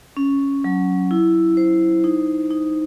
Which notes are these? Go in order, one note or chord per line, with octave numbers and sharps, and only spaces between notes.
C#4
F#3
E4
C5
D#4
D#4